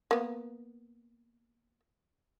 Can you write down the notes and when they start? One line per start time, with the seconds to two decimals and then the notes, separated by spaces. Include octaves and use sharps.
0.11 A#3 B3